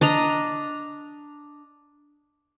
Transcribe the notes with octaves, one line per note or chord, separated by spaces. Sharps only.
D4 D#5 A#5